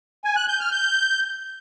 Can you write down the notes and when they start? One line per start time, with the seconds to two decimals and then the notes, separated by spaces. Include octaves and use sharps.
0.25 G#5
0.36 F#6
0.48 G6
0.60 F6
0.72 G6